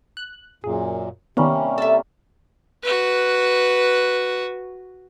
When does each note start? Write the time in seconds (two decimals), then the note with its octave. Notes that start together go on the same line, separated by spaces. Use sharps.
0.17 F#6
0.64 F#2 A#2 G#4
1.37 C3 D#3 G3 A#3 B3 C#4
1.78 A4 E5
2.83 F#4 B4